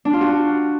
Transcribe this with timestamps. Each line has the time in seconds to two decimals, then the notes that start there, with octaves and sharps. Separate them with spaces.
0.05 D4
0.13 F4
0.21 F#4